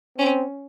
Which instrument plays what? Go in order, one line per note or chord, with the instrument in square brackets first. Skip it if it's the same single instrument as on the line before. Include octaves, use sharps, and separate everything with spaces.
[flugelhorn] C4 [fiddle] C#4